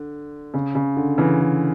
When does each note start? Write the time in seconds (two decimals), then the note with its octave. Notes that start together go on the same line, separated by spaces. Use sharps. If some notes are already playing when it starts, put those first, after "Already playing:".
Already playing: D3
0.54 C#3
0.75 C#3
0.97 D3
1.18 C#3 E3
1.40 D3